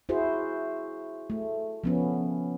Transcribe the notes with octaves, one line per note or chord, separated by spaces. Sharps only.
E4 F#4 G#4 C5
A3
F3 B3 C#4